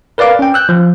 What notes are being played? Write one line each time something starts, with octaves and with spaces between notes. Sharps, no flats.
A#4 B4 D5 F5 D6
C#4 G5
E6 F#6 G6
F3